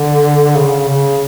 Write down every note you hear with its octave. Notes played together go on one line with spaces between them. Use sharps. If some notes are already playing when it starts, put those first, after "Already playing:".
Already playing: D3
C#3
C#3